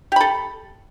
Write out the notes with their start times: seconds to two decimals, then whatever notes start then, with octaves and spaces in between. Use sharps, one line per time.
0.12 G4
0.16 B5
0.21 A4